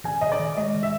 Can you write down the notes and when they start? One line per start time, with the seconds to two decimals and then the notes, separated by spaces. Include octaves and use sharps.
0.04 D#3 G#5
0.21 D#3 D#5
0.32 D5
0.40 D#3
0.57 G#3 D#5
0.75 D#3
0.83 E5